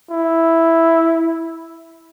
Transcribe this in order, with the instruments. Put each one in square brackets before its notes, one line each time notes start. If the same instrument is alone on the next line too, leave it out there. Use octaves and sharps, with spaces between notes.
[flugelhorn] E4